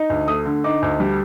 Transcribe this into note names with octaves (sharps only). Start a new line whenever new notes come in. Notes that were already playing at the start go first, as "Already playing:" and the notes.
Already playing: D#4
D2
A3 D#6
D3
D#4 D6
D2
G3